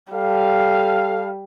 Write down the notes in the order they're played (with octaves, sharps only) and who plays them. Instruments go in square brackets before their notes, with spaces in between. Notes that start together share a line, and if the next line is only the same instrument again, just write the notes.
[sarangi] G3 [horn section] A4 F5